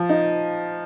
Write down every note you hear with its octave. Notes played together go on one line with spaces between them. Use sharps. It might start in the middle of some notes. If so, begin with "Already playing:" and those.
Already playing: F3
D#4